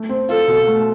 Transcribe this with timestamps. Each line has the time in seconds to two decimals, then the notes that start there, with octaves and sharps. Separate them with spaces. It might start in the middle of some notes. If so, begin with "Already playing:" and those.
Already playing: A3
0.09 C4
0.29 F4 A4
0.48 B2
0.67 A3